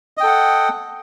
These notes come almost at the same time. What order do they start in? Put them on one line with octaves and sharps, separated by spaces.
D#5 G5 A4 F#5